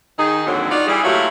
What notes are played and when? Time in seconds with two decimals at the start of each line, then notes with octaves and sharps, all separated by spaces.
0.19 D#3 D#4 G#4
0.46 F2 A#2 D3 D#3 F#3
0.71 D#4 F4 F#4 D5
0.87 E3 G3 G#4
1.04 A#2 F#3 A3 E4 F4 G4